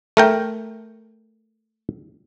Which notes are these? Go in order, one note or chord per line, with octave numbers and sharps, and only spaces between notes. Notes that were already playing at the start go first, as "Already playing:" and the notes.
A3 A#4 G5